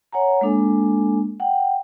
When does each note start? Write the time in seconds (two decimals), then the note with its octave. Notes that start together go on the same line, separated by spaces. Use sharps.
0.13 C#5 F#5 G#5 A#5
0.41 G#3 A#3 D4 A4 G#5
1.40 F#5 G5